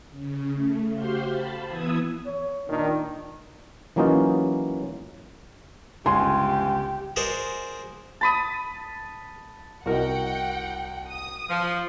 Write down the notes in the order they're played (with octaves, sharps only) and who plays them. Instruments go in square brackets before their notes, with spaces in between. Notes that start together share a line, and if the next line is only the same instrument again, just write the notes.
[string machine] C#3
A3
F#4 G4 C5 F5 C6
A5 B5
E3 B3 D#6 E6 G#6
[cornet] C#5
[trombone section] A#2 D#3 [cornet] D4
[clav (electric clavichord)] E3 F#3 A#3 C#4 D#4 F4
[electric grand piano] G1 C#2 G#5 [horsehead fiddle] G4 [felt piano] C6
[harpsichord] F#4 G#4 A#4 C5 D5 D#5
[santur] A5 B5 D#6
[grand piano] C2 E4 [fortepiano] F#4 A#4 D#5 [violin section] F#5 G5
[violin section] D#6
[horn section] F3